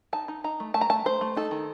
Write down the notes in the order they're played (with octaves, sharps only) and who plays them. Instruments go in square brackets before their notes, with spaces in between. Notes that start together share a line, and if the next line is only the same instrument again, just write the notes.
[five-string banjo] D#4 A5
D#4
D#4 A#5
A3
A3 A5
A#5
A3 A5
A3 C5
A3
D#4 A4
D#3